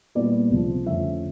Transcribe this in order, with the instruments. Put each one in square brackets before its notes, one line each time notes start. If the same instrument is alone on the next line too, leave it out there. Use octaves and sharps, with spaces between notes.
[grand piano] A#2 G3 B3 E4 D5
C#2 C3 F3
F2 D3 F3 A3 C#4 E5